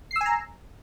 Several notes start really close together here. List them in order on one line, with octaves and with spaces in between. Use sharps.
C7 E6 G#5 A#5